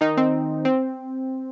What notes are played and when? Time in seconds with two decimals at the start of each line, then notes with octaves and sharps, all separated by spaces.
0.01 D#3 D#4
0.17 C4
0.65 C4